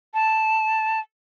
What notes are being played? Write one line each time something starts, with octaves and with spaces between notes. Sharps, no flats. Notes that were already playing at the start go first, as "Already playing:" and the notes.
A5